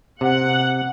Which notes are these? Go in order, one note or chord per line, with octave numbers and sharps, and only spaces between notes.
C3 F#5